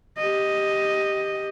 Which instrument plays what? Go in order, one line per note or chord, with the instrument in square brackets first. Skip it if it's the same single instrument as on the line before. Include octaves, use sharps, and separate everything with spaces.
[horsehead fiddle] G4 D#5